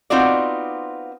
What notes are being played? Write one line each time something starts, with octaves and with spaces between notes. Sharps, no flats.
B3 C4 D#4 F4 F#4 D5